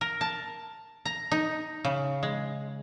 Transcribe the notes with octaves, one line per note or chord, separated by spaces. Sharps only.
A#4
A5
A#5
D#4
C#3
G#3